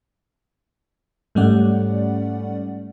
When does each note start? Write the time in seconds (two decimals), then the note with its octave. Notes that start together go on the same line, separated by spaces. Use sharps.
1.35 G#2 G3 A3 C#4 D5 F#5